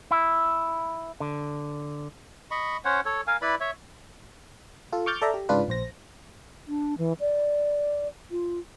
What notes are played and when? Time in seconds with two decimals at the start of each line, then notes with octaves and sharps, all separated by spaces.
0.11 E4
1.20 D3
2.51 D#5 B5 C#6
2.85 C#4 C5 C#5 F#5
3.05 A4 C#5
3.27 A#4 F5 G#5
3.42 E4 B4 D5 B5
3.60 C#5 E5
4.93 F4 A4
5.06 C#6 D6 F6 G6 A6
5.22 A4 D5 E5 A#5
5.34 G4
5.49 G#2 C#3 D4 F4 B4
5.69 A#1 C5 A#6
6.68 D4
6.98 E3
7.20 D5
8.31 F4